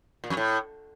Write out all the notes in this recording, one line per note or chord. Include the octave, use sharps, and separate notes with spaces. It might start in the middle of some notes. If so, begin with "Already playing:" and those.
A#2
F2
A2